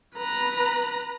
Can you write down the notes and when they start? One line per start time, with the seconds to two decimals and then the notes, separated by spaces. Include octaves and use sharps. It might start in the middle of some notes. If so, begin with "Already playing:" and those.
0.16 B4 A#5